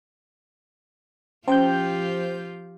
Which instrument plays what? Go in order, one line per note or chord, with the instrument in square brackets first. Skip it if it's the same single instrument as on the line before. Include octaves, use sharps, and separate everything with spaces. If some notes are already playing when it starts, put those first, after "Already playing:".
[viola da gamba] F3 F4 G4 [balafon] C#4 [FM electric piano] C5 G6 [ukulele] G5